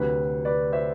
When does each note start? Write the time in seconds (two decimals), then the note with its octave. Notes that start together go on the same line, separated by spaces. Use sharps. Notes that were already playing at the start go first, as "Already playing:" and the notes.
Already playing: D2 C3 F#3 B4
0.45 B4 D5
0.72 C5 E5